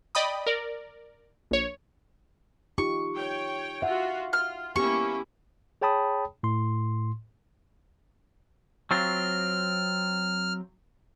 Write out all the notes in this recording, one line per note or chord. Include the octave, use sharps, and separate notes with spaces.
D5 D#5 G5 B5 D#6
A#4 D5
A#1 C#5
D#4 F4 G4 C#6
C#5 G5
F4 F#4 E5 F#5
F4 F6
A#3 B3 C#4 E4 G4 C#6
G#4 C#5 G5 A5 B5 D#6
A2 C6
F#3 C4 F4 F6